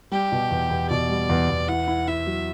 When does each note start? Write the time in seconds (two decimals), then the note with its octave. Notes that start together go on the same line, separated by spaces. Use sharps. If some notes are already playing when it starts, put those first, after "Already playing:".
0.12 G3 G4
0.32 B2
0.51 E2
0.70 E2
0.90 B2 D5
1.09 G3
1.29 E2
1.49 E2
1.68 E4 F#5
1.88 E4
2.07 E4 E5
2.27 F#3